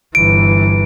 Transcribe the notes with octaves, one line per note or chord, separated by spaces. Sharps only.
G1 E3 D7